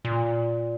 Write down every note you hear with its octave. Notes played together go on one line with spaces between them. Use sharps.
A#2